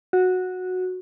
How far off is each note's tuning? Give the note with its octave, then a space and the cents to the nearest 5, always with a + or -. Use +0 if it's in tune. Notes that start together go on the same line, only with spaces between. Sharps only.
F#4 -10